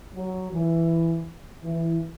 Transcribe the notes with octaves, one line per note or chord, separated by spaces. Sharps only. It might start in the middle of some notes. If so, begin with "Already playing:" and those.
F#3
E3
E3